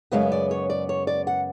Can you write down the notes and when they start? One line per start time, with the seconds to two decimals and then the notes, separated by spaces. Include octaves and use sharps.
0.12 F#2 C#3 G#3 B3 F5
0.32 D5
0.51 C#5
0.70 D5
0.89 C#5
1.07 D5
1.27 F#5